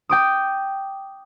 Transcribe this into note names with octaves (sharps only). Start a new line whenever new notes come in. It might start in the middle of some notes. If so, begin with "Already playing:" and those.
G5 D6 D#6